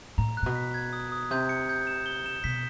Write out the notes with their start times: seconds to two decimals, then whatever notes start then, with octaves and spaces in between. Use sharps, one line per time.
0.18 A2 A#5
0.37 F#6
0.42 A#2
0.46 B2
0.55 B6
0.74 G#6
0.93 D#6
1.12 D#6
1.31 C3 G6
1.49 C#7
1.69 G6
1.87 E7
2.06 G7
2.26 E7
2.44 B2 B6